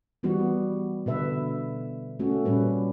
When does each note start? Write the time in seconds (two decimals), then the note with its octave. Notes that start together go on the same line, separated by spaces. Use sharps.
0.23 E3 G3 B3 F#4
1.06 B2 D3 B4 E5
2.19 A3 C#4 F#4
2.45 A#2 G3 C#4 B4